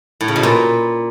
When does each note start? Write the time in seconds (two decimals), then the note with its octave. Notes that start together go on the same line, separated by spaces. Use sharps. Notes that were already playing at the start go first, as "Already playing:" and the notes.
0.21 A2
0.28 C#3
0.36 B2
0.43 A#2